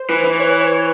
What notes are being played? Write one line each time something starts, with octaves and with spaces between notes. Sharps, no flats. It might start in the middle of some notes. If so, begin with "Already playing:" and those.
Already playing: C5
E3 B4
E3
C#5
C#5